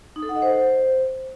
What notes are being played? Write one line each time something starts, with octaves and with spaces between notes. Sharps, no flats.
D#4
A4
F#5
D#5
C5